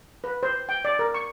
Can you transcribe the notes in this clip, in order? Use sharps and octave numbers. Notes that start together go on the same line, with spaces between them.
B4
C5
G5
D5
A#4
C#6